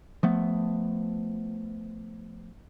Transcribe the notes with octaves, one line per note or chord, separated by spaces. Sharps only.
F3 A3 B3